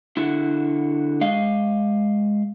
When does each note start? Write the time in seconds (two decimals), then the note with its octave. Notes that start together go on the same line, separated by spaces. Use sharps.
0.17 D3 E4 F#4
1.21 G#3 D#5 F5